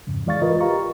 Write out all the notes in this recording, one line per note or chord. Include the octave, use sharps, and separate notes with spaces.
F2 G#2 C#3
E3 G#3 D5 F5 C#6 A6
F4 A#4 B4 D#5
G4 F5 A#5 C#6